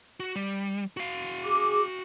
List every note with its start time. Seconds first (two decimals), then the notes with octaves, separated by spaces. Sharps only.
0.20 F#4
0.36 G3
0.97 F#4 F5
1.45 G#4 D6